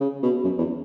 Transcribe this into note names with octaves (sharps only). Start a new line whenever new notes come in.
C#3
B2
F#2
E2